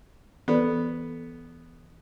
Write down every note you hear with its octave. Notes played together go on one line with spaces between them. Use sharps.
E3 B3 A4 D5